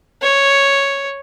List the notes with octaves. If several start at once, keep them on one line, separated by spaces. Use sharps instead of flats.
C#5